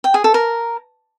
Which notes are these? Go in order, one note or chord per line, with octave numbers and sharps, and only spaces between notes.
G5
G#4
A4
A#4